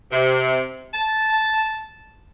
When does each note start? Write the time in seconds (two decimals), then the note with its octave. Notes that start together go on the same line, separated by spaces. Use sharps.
0.12 C3
0.94 A5